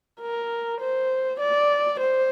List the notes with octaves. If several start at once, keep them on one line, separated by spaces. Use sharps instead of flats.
A#4
C5
D5
C5